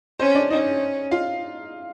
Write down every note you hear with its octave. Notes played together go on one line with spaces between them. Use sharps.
C4 C#4 C5
D4 D5
C#4 D#4 D#5
F4 F5